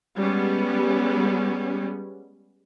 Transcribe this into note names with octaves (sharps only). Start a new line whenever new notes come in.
G3 G#3 B3 C#4